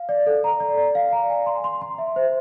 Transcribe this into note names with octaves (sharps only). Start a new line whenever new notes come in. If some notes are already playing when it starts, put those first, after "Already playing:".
Already playing: F5
D5
A4
A#5
D5
D5
F5
A#5
G#5
C6
C6
C6
E5
C5